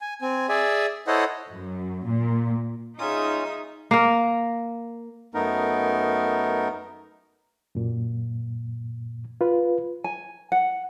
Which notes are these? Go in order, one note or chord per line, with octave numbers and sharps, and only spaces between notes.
G#5
C4 G#5
G#4 D5 E5 G#5
E4 A4 C5 C#5 D#5 F#5
F#2
A#2
C#4 D#4 F4 G#4 E5 D#6
A#3 A#4
F#2 A3 B3 D#4 A#4
F#2 A#2
F4 B4
G#5
F#5